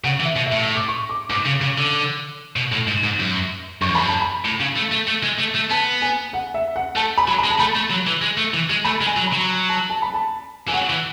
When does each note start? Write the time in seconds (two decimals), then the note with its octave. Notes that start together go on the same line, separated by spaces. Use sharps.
0.04 C#3 F#5
0.20 E3
0.25 E5
0.36 B2
0.46 E5
0.52 A2
0.62 E6
0.75 D6
0.88 C#6
1.10 D6
1.30 G#2 D6
1.46 C#3
1.61 C#3
1.78 D3
2.56 B2
2.72 A2
2.87 G#2
3.04 G#2
3.19 F#2
3.82 F#2 C#6
3.90 E2
3.95 F#2 B5
4.08 A5
4.21 B5
4.45 A2
4.60 C#3
4.76 A3
4.92 A3
5.08 A3
5.24 G#3
5.39 A3
5.55 A3
5.70 B3 A5
6.02 G#5
6.33 F#5
6.54 E5
6.76 F#5
6.96 A3 A5
7.18 B5
7.28 F#3
7.39 B5
7.44 G#3
7.50 A5
7.59 A3 B5
7.75 A3
7.90 F#3
8.07 E3
8.22 G#3
8.38 A3
8.54 E3
8.70 G#3
8.84 A3 B5
9.01 G#3
9.07 G#5
9.17 F#3
9.27 B5
9.33 F#3
9.69 A5
9.90 A5
10.02 B5
10.14 A5
10.68 E3 G#5
10.73 F#3 F#5
10.90 E3